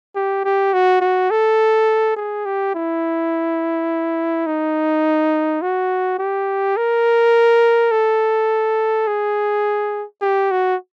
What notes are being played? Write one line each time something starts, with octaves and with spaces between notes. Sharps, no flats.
G4
G4
F#4
F#4
A4
G#4
G4
E4
D#4
F#4
G4
A#4
A4
G#4
G4
F#4